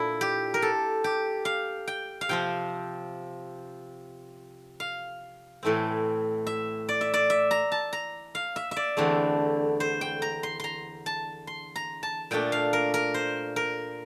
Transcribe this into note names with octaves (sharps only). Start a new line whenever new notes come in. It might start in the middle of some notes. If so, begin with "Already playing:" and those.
Already playing: A#2 D4 E4 A4
G4
A#4
A4
G4
F5
G5
F5
C3 F3 C4 G5
F5
A2 E3 A3 C4
E5
D5
E5
D5
E5
A#5
A5
A#5
F5
E5
E5
D5
E2 D3 A3 C4
C5
G5
A#5
C6
A#5 C6
A5
C6
A#5
A5
A#2 A3 D4 G5
F5
A#4
A#4
C5
A#4